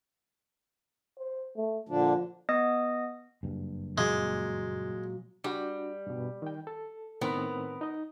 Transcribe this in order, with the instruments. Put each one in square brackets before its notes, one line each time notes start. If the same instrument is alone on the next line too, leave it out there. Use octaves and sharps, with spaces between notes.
[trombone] C5
A3
[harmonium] A#2 D3 D4 [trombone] F3
[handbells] B3 D#5 D#6
[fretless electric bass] F#1 G2
[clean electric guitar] A#2 F#3 [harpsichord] G#3
[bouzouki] G3 [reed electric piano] D4 F#4
[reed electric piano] G2 B2
D#3 G5
A4
[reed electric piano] A2 D#3 C4 [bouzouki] B3 A#4
[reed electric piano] D#4 D#5